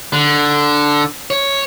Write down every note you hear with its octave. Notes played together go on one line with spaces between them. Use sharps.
D3
C#5